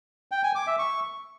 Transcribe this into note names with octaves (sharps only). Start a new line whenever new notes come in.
G5
G#5
D6
E5
C#6